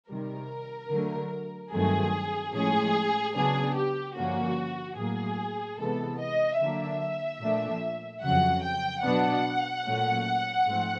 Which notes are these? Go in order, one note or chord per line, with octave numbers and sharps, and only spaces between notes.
C3 D#3 G3 A#4
D3 F#3 A3
G2 D#3 F#3 A3 C4 G#4
A2 F3 G#3 C#4 G#4
C#3 F#3 B3 D4 G#4
G4
G2 D3 F3 A#3 C#4 F#4
A2 F#3 A#3 G#4
C3 E3 G#3 B3 A4
D#5
D3 F#3 A#3 D4 E5
A#2 F3 A3 D4
F2 C#3 F#3 F#5
G5
B2 F#3 B3 D4 F#5
A#2 F#3 A3 C#4
G#2 F3 A3 C4